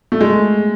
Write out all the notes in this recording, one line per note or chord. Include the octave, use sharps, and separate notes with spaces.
A3
G#3